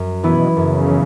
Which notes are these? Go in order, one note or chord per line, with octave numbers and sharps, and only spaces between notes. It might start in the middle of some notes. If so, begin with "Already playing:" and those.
Already playing: F#2
B2 E3 B3 E4
F#2 C#3
E3